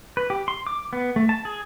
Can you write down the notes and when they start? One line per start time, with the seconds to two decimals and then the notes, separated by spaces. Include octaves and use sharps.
0.17 B4
0.30 G4
0.48 C6
0.67 D6
0.93 B3
1.16 A3
1.29 A5
1.45 G#4